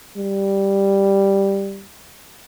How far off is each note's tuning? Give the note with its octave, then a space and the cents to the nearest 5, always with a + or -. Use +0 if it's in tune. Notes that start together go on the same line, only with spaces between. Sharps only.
G3 +0